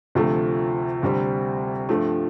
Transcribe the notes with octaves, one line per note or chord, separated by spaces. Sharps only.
D2 C3 F3 A3
D2 C3 G3 C4
G2 F3 A3